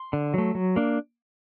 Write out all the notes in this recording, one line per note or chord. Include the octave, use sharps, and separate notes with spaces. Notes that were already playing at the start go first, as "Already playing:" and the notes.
Already playing: C6
D3
F#3 A3
F#3
A#3 D4